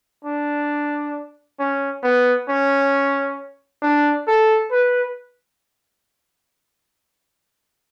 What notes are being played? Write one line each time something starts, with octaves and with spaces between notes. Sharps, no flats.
D4
C#4
B3
C#4
D4
A4
B4